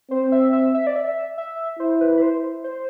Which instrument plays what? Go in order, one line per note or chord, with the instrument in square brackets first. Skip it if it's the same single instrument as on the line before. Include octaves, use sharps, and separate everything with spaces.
[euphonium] C4 [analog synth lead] C5
[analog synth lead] E5
E5
E5
D5
E5
E5
[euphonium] E4 [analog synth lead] C5
[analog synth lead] B4
B4
C5
C5